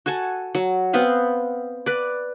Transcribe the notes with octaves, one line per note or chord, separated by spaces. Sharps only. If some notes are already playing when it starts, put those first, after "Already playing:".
F#4 A4 G#5 A5
F#3
B3 C4 B4 F5
B4 D5